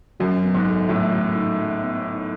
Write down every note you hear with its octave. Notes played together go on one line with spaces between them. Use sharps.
F#2 F#3
B3
G#2
A4
A2 F#3
F#3
D#4
F#3
B3
D#4